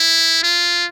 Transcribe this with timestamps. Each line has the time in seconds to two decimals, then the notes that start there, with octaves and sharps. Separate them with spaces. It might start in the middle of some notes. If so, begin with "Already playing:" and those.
Already playing: E4
0.44 F4